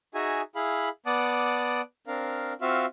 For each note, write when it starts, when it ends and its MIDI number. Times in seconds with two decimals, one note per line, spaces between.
0.14 0.42 63
0.14 0.42 66
0.14 0.42 68
0.14 0.42 76
0.14 0.42 80
0.56 0.89 64
0.56 0.89 68
0.56 0.89 77
0.56 0.89 83
1.06 1.81 59
1.06 1.81 74
1.06 1.81 78
1.06 1.81 81
1.06 1.81 86
1.06 1.81 87
2.07 2.53 60
2.07 2.53 62
2.07 2.53 70
2.07 2.53 77
2.61 2.86 60
2.61 2.86 65
2.61 2.86 66
2.61 2.86 76
2.61 2.86 77